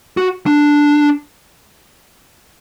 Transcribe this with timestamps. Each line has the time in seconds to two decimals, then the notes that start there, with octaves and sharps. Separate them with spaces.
0.17 F#4
0.46 D4